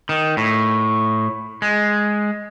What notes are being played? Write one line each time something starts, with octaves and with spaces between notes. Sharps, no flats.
D#3
A2
G#3